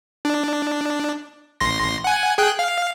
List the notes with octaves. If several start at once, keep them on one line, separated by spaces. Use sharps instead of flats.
D4
A1 C6 A#6
F#5 G#5
G#4 G5 F#6
F5